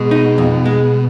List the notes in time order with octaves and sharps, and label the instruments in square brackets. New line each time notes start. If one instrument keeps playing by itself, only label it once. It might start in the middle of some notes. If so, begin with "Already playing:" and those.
Already playing: [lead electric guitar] B2 [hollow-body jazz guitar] G#3
[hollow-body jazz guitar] D#4
F2
G#3